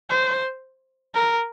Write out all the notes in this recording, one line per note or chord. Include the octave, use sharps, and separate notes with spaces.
C5
A#4